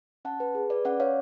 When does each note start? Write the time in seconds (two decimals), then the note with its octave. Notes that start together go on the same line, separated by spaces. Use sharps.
0.25 C#4 F#5 A5
0.40 B4
0.55 G#4
0.70 B4 D5
0.85 C#4 D5 F#5
1.00 C#5 F5